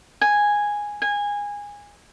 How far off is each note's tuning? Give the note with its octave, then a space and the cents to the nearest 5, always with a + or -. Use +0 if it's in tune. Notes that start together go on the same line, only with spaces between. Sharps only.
G#5 -5
G#5 -20